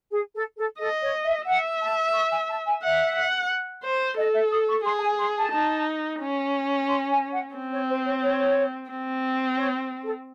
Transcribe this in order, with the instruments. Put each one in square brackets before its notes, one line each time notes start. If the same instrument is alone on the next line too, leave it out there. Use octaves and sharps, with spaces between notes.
[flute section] G#4
A4
A4
[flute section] A4 [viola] D#5
[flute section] C#5
E5
[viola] E5 [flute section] F#5
[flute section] A5
C#6
G#5
A5
G#5
[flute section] E5 [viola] F#5
[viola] F#5
C5
[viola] A4 [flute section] D#5
[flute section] E5
D#6
C#6
[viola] G#4 [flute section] C6
[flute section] A5
G#5
C6
A5
[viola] D#4
C#4
[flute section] C6
G#5
F#5
[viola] C4
[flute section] C#5
C5
C#5
C#5
[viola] C4
[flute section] C#5
A4